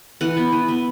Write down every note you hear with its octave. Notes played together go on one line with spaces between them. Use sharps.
E3 F#5
B3
E3
B3